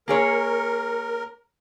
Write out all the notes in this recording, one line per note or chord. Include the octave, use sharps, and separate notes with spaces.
A#3 G#4 A#4 C#5